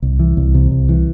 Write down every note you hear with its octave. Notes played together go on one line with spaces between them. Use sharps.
C2
E3
C2
C3
C2
E3